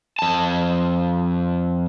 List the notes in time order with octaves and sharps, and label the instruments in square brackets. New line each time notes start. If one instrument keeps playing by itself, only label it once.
[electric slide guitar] F2 A5